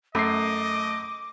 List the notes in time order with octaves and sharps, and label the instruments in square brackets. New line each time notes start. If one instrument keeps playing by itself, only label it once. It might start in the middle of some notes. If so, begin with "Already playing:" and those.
[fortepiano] F#2 [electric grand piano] A3 C7 [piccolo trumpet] D#5 [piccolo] D6